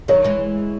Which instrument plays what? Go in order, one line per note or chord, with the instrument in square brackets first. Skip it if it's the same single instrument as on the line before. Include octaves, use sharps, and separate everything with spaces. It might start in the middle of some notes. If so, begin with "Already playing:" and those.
[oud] D#3 F#3 [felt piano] C#5
[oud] E3 G#3